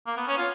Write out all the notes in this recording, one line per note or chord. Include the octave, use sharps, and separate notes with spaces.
A#3
B3
C#4
F4